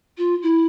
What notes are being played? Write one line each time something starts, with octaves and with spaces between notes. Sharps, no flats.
F4
E4